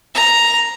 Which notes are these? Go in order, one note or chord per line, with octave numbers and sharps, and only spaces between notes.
A#5